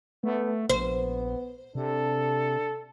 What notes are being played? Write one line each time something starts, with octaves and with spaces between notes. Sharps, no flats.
A3 B3
A#1 B3 C5
C3 D4 A4